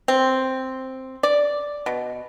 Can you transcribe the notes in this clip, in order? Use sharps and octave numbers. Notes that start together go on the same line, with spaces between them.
C4
D5
B2